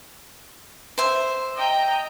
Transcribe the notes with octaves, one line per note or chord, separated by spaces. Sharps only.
C5 E5
D#5 G5 A#5